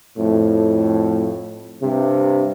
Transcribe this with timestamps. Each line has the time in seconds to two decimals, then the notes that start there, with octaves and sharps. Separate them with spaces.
0.17 F2 A2
1.81 G2 C3